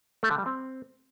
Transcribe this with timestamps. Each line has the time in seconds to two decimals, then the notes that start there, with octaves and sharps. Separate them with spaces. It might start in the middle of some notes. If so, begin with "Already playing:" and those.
0.23 A3
0.31 D3
0.38 G3
0.46 C4